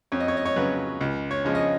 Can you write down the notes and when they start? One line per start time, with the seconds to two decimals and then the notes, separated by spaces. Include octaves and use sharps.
0.12 F2 C#5
0.20 D#5
0.28 C#5
0.37 D#5
0.45 C#5
0.56 C#3 F#3 B4
1.01 C#2
1.31 C#5
1.45 C#3 F3 G#3
1.55 D#5
1.60 C#5